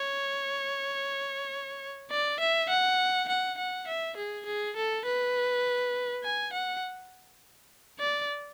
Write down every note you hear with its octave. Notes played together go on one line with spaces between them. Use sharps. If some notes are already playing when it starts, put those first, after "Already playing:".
Already playing: C#5
D5
E5
F#5
F#5
F#5
E5
G#4
G#4
A4
B4
G#5
F#5
D5